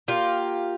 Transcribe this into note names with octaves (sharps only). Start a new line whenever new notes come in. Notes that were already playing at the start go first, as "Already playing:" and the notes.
A#3 F4 G4